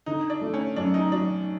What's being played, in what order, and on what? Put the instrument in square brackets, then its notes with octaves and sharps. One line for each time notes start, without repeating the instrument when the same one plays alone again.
[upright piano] D3 [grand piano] D#4
[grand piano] D4
[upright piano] A3
[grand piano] C#4
[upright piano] F#2 [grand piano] D4
[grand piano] D#4
[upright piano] F#3 [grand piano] D4